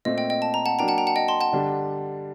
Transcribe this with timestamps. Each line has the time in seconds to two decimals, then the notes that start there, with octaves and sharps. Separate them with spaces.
0.05 A#2 A3 C4 D#5
0.18 D#5 G5
0.30 D#5 G5
0.42 A5
0.54 A#5
0.66 F#5 A5
0.79 F#3 A#3 D4 G5 A#5
0.88 F#5 A5
0.98 G5 A#5
1.07 F#5 A5
1.16 D#5 G5
1.28 A5 C6
1.41 F#5 A5
1.53 D3 G3 D4